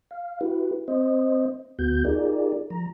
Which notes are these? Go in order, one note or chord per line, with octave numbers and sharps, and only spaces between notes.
F5
E4 F#4 G4 B4
C4 C5 D#5
D2 B3 F#4 G6
D#4 F4 G4 G#4 A#4 D5
F3 A#5